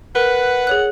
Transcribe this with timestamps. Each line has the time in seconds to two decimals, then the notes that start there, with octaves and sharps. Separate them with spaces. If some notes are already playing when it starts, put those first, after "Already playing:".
0.15 A#4 B4 F#5
0.67 G#4 C#5 F#6